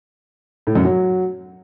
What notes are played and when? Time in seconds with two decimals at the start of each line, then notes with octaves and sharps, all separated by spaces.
0.67 A2
0.75 F#2
0.84 F#3